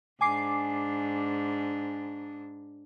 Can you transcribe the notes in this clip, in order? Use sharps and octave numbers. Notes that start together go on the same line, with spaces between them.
G#2 D4 G#5 D6 C7